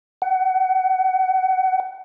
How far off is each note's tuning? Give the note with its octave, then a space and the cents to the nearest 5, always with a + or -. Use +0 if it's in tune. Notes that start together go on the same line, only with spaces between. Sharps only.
F#5 +30